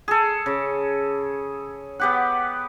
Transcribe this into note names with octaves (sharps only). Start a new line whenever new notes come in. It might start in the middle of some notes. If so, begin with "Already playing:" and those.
G#4 A4
C#3
B3 G4 F#5